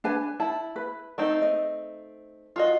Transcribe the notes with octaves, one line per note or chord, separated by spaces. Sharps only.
D4 B4 G#5
E4 A5
B4
A3 C4 D#4
D#5
F4 F#4 D#5